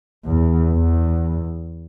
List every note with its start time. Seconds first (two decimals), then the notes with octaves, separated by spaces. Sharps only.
0.25 E2
0.71 E2